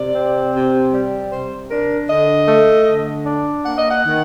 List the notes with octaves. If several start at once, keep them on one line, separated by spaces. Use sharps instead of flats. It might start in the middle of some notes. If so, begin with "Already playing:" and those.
Already playing: C3 D5
C4
C3
G3
C3 C5
D4 A#4
D3 D#5
A3
D3
D4
A#3 F#5
D#5
F#5
D#3